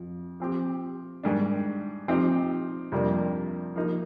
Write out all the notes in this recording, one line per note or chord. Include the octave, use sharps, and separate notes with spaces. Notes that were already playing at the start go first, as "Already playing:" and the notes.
Already playing: F2
F3 C4 G4
G#2 D#3 G3 D4
F3 C4 D#4 G4
F2 C3 G3 A#3 D4
F3 A#3 D#4